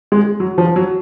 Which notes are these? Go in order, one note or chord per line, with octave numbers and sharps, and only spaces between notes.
G#3
F#3
F3
F#3